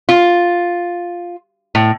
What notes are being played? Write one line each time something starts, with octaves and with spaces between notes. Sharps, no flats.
F4
A2